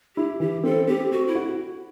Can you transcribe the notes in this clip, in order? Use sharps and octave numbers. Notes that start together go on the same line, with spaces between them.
E4 G4
E3 G4
C4 A4
C4 G4
F#4 A4
E4
F#4